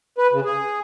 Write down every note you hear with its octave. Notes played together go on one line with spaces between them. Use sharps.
B4
C#3
G#4